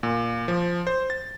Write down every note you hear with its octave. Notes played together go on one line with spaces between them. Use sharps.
A#2
F3
C5
A6